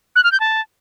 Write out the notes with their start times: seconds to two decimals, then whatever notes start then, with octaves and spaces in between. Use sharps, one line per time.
0.16 F#6
0.24 F6
0.32 G6
0.40 A5